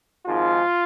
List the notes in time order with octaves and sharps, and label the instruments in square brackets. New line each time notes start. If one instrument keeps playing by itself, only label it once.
[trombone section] G#1 G#2 F3 F4